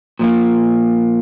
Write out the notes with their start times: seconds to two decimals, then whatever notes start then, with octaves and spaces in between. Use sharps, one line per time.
0.19 A#2 F3 A#3